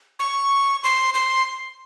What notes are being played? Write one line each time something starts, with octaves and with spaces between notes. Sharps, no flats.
C#6
C6
C6